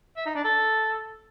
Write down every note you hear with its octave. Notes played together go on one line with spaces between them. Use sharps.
E5
D#4
D4
A4